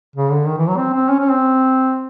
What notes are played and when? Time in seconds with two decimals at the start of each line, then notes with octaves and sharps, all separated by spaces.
0.16 C#3
0.31 D3
0.47 D#3
0.58 E3
0.68 F#3
0.78 C4
0.94 C4
1.09 C#4
1.20 C#4
1.30 C4